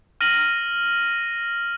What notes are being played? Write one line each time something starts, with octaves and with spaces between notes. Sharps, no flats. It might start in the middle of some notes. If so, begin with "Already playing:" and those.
F6 A#6 D#7 F#7